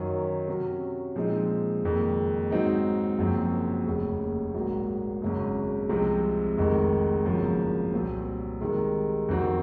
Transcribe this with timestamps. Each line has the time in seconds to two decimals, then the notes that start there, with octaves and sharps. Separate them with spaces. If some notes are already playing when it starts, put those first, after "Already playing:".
Already playing: F#2 D#3 F#3 C#4
0.48 C3 F#3 C#4
1.15 A#2 F3 G#3 C4 D#4
1.83 F#1 F2 D#3 G#3
2.51 G#2 F#3 C4 D#4
3.18 F#1 F#2 F3 C4
3.86 F1 D#2 C#3
4.54 A#1 G#2 F#3 A#3
5.22 G#1 F#2 C#3
5.89 C2 C3 F3 G#3 C4
6.57 F1 F2 D#3 G#3
7.26 G#1 F#2 C#3 F3 A#3
7.93 C2 A#2 F#3 C4
8.61 C2 C3 D#3 G#3
9.28 F2 D#3 F#3 C4 F#4